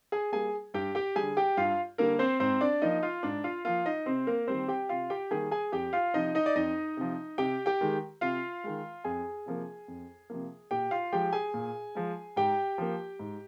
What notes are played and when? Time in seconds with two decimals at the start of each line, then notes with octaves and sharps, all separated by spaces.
0.12 G#4 G#5
0.32 G3 A#3 G#4 G#5
0.74 G2 G4 G5
0.95 G4 G5
1.16 D3 G3 G#4 G#5
1.37 G4 G5
1.57 G2 F4 F5
1.98 D3 G3 A#3 A#4
2.19 C4 C5
2.40 G#2 C4 C5
2.61 D4 D5
2.82 F3 A#3 D#4 D#5
3.03 F4 F5
3.23 G#2 D4 D5
3.44 F4 F5
3.65 F3 A#3 F4 F5
3.86 D#4 D#5
4.06 C3 C4 C5
4.27 A#3 A#4
4.47 D#3 G3 A#3 C4 C5
4.68 G4 G5
4.89 C3 F4 F5
5.10 G4 G5
5.31 D#3 G3 A#3 G#4 G#5
5.51 G#4 G#5
5.72 F2 G4 G5
5.93 F4 F5
6.14 C3 F3 D#4 D#5
6.35 D#4 D#5
6.46 D5
6.56 F2 D#4 D#5
6.97 C3 F3
7.38 C3 G4 G5
7.66 G4 G5
7.81 D#3 G#3
8.21 C3 F4 F5
8.64 D#3 G#3
9.05 F2 G#4 G#5
9.46 C3 F3 A#3
9.88 F2
10.30 C3 F3 A#3
10.71 A#2 G4 G5
10.91 F4 F5
11.12 F3 G#3 G4 G5
11.33 G#4 G#5
11.54 A#2
11.95 F3 G#3
12.36 G#2 G4 G5
12.78 F3 A#3
13.19 G#2